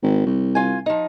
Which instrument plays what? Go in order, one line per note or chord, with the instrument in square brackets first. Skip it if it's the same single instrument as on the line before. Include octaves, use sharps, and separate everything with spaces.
[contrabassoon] G#1
C2
[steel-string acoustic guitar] F4 G#5
F3 D#4